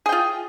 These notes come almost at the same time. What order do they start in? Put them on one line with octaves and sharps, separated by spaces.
G#4 G5 F4